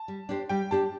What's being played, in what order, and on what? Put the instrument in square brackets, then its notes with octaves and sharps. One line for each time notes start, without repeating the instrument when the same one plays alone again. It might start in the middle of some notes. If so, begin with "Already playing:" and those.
Already playing: [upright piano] A5
[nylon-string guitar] G3
D4 G4 C5
[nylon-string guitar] G3 [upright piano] G5
[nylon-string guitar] D4 G4 C5 [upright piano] A5